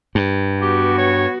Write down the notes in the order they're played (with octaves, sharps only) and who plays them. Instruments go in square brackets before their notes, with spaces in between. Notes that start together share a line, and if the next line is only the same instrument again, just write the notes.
[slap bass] G2
[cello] B3 F#4 [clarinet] G4
[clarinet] C#5